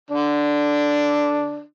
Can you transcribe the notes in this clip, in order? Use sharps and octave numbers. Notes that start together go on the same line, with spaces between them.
D3 D4